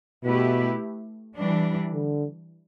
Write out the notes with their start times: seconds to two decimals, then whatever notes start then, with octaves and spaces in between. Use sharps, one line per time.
0.25 B2 A3 E4 G4 B4
1.36 E3 G3 D4
1.93 D3